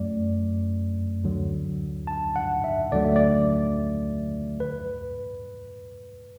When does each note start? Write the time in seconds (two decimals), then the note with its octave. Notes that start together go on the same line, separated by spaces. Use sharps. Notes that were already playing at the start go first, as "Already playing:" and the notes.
Already playing: F#2 F#3 A3 D5
1.24 D2 D3 F#3
2.07 A5
2.36 F#5
2.64 E5
2.91 D2 D3 F#3 A3 D5
3.05 E5
3.16 D5
4.60 B4